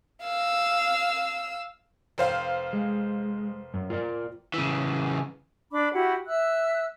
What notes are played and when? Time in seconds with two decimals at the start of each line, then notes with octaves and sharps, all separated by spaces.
0.23 F5 E6
2.18 F1 C5 F5
2.73 G#3
3.74 F#2
3.90 F4 A#4 D5
4.54 C#3 E3
5.71 D4 D5 B5 D6
5.93 E4 F#4 G4 F#5
6.25 E5 E6 F#6